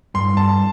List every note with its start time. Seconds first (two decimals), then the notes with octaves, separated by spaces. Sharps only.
0.14 G2 C6
0.37 A5